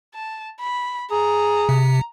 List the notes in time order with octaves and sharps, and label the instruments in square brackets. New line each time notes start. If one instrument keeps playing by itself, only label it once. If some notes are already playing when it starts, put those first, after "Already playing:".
[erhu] A5
B5
[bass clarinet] G#4 [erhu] A#5
[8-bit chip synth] C3